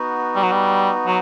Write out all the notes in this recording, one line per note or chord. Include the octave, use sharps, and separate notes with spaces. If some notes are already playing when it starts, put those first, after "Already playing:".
Already playing: B3 D#4 F#4
G3
F#3
G3
F#3